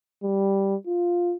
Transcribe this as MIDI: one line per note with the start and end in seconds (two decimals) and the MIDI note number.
0.24 0.76 55
0.87 1.35 65